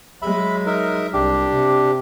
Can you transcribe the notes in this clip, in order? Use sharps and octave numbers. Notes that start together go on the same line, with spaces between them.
F#3 G#3 E5 B5
D#4 A#4 E5
C2 D4 G4
C3